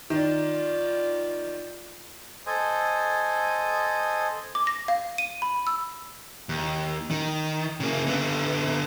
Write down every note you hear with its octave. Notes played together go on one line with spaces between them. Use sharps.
D#3 F4 D5
A4 C5 D#5 G#5
D6
A#6
F5
D#7
B5
E6
D#2
D#3
C#3 A#3
D3 B3